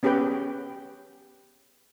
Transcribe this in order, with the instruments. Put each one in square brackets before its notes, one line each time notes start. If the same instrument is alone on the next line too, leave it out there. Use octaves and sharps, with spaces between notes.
[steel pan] B3 C#4 G4 G#4 B4 G5